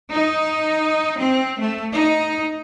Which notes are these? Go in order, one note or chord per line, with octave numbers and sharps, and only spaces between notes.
D#4
C4
A3
D#4